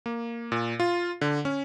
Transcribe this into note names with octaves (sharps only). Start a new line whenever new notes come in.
A#3
A#2
F4
D3
C#4